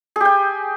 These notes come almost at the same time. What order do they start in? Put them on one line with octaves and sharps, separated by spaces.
G#4 G4 G5